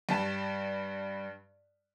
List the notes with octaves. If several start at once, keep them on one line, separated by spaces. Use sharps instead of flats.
G2 G3 A5